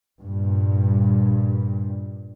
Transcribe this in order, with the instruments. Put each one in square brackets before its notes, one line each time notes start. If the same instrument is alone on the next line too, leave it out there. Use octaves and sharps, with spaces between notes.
[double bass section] G2 A#2